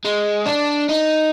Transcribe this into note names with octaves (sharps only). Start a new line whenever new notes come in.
G#3
D4
D#4